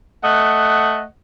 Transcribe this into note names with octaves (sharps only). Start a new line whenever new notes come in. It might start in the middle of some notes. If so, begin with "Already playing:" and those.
A3 D#5 F#5